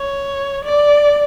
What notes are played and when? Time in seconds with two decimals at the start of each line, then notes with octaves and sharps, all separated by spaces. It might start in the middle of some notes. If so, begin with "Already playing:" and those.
Already playing: C#5
0.65 D5